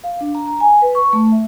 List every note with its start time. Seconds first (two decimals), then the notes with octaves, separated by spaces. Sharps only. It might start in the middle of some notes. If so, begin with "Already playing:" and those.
0.04 F5
0.21 D4
0.35 A#5
0.46 A#5
0.60 G#5
0.82 B4
0.95 C#6
1.13 A3
1.32 E5